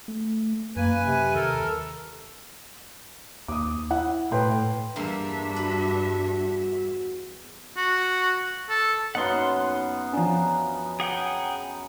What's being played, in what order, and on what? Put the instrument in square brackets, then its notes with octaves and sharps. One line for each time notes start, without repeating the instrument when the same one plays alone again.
[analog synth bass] A3
[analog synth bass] F#2 [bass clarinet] A#3 [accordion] B4 G#5
[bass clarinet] C3
[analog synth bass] D#2 [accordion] A4 A#4
[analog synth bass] D#2 [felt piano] D6 D#6
[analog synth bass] E4 [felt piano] F#5
[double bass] A2 [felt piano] B4 G5 C6
[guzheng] E2 A#3 C6 [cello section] G2 E5 [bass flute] D4
[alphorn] F#4 [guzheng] B4
[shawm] F#4
A4
[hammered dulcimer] F#2 B3 D#4 [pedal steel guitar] F#5 C6
[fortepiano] F3 D4 [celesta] G#5 A#5
[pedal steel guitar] G#4 F#5 G5